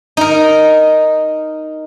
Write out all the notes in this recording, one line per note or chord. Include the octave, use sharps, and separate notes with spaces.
D#4 A#4